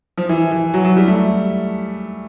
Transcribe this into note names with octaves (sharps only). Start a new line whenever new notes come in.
F3
E3
E3
F#3
F#3
G3
A3